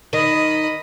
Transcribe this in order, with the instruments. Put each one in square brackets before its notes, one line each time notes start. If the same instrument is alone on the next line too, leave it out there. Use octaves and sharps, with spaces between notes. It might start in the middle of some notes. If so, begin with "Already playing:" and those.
[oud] D#3 [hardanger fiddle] D#5 B5